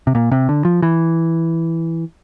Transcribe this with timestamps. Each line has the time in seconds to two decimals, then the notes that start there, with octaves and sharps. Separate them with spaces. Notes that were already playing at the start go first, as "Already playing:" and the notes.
0.07 C3
0.15 A#2
0.31 C3
0.49 D3
0.65 F3
0.82 E3